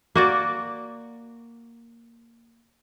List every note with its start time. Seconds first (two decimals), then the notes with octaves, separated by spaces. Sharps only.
0.15 A#3 F#4 D5